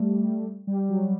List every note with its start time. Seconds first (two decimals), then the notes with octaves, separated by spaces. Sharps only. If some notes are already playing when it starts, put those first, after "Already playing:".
Already playing: G3 A3
0.67 G3
0.89 F#3